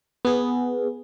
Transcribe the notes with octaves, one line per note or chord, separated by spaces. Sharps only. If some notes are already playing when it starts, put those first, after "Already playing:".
B3 G#4